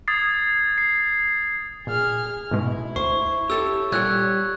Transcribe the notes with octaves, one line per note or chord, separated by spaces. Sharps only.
D#6 G#6 A6 C7
C7
A#2 G#4 F6
G#2 B2 G#3 E4
D2 C5 C#6
G4 A4 C#5 E6
A#2 G3 A4 C#5 F#5 E6 F#6 G#6